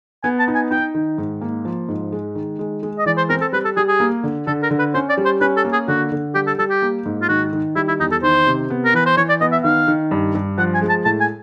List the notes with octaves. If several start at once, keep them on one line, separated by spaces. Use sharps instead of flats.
B3 G#5
A5
D#4
G#5
D#4 G5
D#3
G#2
A#3
F3
G#2
G#3
D#3
G#3
G#3
D#5
E3 D5
C5
C4 A#4
A4
G3 B4
A4
G3 G#4
G#4
A#3
D3
D3 A4
A#4
D3
B4
C#4 C5
D5
G3
C5
C#4 B4
A4
A#3
G#4
D3 F#4
D3
G3 G4
A4
G3 A4
G4
A#3
G#2
F4
D#3 F#4
D#3
G3 E4
E4
E2 D#4
A4
D#3 C5
C3
B3
A#4
E3 B4
C5
E3 C#5
D5
B3 D#5
E5
D#3 F5
D#3
G2
G2
F3 F#5
G#5
G#3
A5
A2 A5
G#5